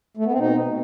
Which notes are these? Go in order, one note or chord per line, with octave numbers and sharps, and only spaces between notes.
A3
B3
C4
B2 D#4
B2